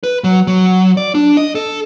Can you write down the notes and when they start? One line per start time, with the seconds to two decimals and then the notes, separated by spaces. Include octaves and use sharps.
0.03 B4
0.24 F#3
0.47 F#3
0.97 D5
1.15 D4
1.37 D#5
1.55 A4